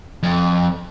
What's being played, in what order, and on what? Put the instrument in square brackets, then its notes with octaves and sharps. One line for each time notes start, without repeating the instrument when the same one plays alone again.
[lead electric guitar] F2